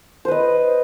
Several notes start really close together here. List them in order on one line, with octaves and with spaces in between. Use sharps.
C5 B4 D#5